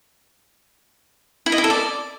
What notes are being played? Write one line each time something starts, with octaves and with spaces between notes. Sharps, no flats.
E4
D#5
E4
A4
D5